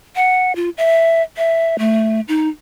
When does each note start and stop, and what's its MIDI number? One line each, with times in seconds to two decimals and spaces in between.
0.16 0.53 78
0.56 0.70 65
0.78 1.22 76
1.37 1.78 76
1.79 2.21 57
2.28 2.48 63